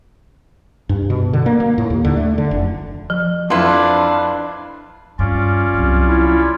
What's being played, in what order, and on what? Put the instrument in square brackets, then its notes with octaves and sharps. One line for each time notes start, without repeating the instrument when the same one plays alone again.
[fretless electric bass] G2
B2
D3
A#3
A#3
A2
D#2
D3
A3
D3
F1
[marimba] F3
[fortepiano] F2 [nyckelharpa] D4 F5 [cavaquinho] E4 B4 C6
[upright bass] G2 [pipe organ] C#4 F4 D5
[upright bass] C2 F#3
[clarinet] E4